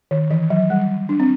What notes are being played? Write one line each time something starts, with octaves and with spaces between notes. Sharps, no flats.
D#3
E3
F#3
G3
D4
C4